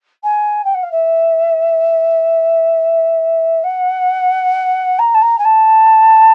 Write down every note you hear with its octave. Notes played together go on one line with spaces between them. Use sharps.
G#5
G5
F#5
F5
E5
F#5
A#5
A5
A#5
G#5
A5